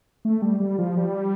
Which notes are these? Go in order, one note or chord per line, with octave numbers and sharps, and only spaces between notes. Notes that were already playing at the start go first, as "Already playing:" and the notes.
A3
G3
G3
F3
G3